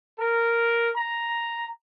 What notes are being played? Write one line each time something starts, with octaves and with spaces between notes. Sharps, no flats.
A#4
A#5